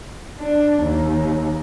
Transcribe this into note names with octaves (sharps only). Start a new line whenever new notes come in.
D4
D#2